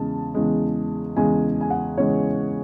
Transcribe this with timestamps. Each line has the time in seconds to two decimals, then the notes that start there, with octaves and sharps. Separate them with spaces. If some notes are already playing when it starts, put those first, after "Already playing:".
Already playing: E2 C#3 G#3 A5
0.34 E2 C#3 G#3
1.16 E2 C#3 G#3 G#5
1.61 G#5
1.70 F#5
1.97 E2 C#3 G#3 C#5